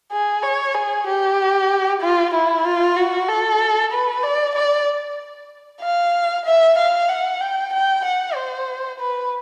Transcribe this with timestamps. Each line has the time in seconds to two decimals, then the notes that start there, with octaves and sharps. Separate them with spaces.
0.12 G#4
0.43 C#5
0.75 G#4
1.07 G4
2.01 F4
2.34 E4
2.65 F4
2.97 F#4
3.28 A4
3.92 B4
4.23 D5
4.55 D5
5.82 F5
6.45 E5
6.78 F5
7.09 F#5
7.41 G5
7.73 G5
8.05 F#5
8.35 C5
9.00 B4